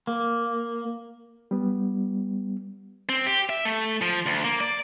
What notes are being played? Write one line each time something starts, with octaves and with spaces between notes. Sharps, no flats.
A#3
G3 B3
C4
G4
E5
A3
F3
D2
A#3
D5